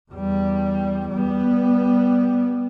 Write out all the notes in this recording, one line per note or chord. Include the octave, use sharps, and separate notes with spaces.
E2 G3
G3 B3